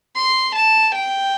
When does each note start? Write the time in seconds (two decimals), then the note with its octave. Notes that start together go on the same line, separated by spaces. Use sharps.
0.16 C6
0.55 A5
0.95 G5